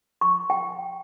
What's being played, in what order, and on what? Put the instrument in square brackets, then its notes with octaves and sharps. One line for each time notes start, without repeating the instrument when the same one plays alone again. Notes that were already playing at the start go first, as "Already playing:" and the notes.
[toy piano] C#6
G5